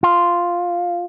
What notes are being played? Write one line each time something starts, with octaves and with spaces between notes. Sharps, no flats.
F4